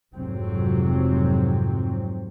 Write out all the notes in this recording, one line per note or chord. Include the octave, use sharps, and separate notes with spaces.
F1 G#2 C3 F#3 C4